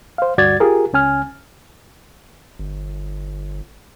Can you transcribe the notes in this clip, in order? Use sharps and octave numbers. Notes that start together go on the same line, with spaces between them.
C5 F5
D2 G2 F#4 D5 G#6 A6
F4 G4 G#4 A#4
C#2 C#4 G#5 F6
G1